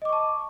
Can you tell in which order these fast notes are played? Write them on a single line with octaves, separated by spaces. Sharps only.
D#5 D6 C#6 A5